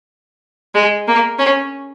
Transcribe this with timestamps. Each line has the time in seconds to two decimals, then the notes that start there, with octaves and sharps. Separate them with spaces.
0.74 G#3
1.07 A#3
1.38 C#4